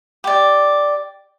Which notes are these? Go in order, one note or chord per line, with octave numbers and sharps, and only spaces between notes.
G4 D5